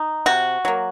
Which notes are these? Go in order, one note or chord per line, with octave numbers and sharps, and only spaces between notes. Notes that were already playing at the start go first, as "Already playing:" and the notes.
Already playing: D#4
C3 F#4
F#3 A#3